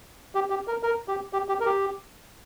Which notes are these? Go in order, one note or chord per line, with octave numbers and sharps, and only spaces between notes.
G4
G4
A#4
A#4
G4
G4
G4
A#4
G4